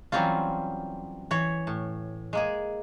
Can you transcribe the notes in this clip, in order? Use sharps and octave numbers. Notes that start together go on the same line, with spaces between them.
E3 F#3 G3 C4 C#4 F4
E3 C#5
A2
G#3 A#3 G#4